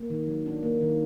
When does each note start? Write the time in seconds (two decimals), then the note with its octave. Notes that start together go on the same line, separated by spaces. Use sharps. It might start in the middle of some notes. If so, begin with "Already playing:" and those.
Already playing: A#3
0.10 D#3
0.28 F#3
0.46 D4
0.63 A#3
0.81 D#3